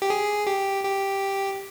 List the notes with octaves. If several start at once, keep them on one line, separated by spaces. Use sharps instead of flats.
G4
G#4
G4
G4